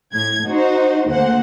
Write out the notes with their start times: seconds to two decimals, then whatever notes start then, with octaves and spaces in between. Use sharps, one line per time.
0.13 A2 G#6
0.46 D#4 F#4 C5
1.08 D2 A#3 C5 F#5